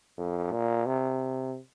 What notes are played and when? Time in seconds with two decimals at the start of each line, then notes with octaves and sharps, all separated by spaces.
0.18 F2
0.52 A#2
0.86 C3